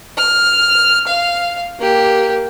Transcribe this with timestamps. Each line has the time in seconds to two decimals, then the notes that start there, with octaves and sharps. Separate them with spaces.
0.17 F6
1.07 F5
1.79 A#3 G4